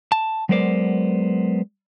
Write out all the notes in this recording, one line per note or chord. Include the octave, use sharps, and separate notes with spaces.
A5
F#3 G#3 B3 A#4 C5 D5